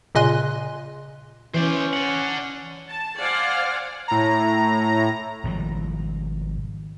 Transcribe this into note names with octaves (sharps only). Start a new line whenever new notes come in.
A#2 C#3 D#5 G#5 C6 F#6
E3 C#4 C5 D5
D5 F#5
A5
C5 D5 F5 F#5 G#5
A2 A#5
G#1 B2 F3 G3